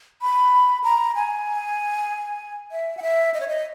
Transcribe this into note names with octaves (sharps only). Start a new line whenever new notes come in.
B5
A#5
G#5
E5
F#5
E5
D#5
C#5
D#5